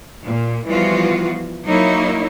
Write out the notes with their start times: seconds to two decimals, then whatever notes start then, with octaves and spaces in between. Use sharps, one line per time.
0.24 A#2
0.67 E3 F3 G3 B3 F4 F#4
1.65 F#3 A#3 D#4 E4 C#5